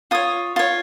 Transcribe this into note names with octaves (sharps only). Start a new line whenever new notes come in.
F4 C#5 D#6
F4 C#5